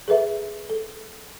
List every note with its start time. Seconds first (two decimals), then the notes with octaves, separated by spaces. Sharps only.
0.08 G#4 A4 B4 E5
0.70 A4